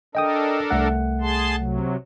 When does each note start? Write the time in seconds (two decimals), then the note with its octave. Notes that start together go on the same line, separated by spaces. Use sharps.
0.15 D4 A4 A#4 D#5 G5 D#6
0.70 C2 A3 F#5
1.21 G#4 A5 C6
1.58 C3 F#3